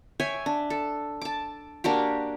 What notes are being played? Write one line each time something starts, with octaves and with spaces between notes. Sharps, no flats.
C#5 E5 G5 G#5
D4
A4
A5 D6
A#3 D4 F#4 G4